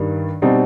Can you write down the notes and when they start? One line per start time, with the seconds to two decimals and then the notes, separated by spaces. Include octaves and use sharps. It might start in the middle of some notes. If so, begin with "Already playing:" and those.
Already playing: G2 D#3 G3
0.42 B2 G3 C4 D#4